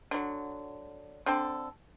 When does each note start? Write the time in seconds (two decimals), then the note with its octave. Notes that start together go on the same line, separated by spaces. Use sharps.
0.11 D3 F#3
1.26 D3 C4 D4 A4